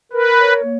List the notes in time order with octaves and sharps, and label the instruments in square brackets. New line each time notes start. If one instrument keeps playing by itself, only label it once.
[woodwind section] A#4 [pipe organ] B4
[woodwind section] C#5
A#3